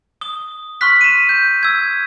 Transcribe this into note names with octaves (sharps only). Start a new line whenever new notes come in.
D#6 G7
C6 C#6 F6 F#6 B6
D#7 E7
G6
E6 G#6